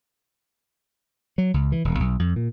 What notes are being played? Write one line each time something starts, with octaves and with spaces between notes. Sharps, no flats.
F#3
C#2
E3
E1
B1
F2
A#2